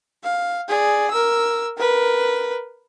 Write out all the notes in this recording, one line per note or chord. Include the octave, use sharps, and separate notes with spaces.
F5
G#4 D5
A#4 E6
A#4 B4